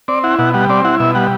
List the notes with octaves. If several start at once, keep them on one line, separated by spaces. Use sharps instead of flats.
C4 D5
E4 F#5
B2 F#5
G3 F#5
C4 D5
E4 F#5
B2 E5
G3 F#5